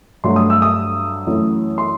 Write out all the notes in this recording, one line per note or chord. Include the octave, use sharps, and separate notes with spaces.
G2 F#3 A3 C6
D#6
E6
D#6
F#2 E3 A3
C6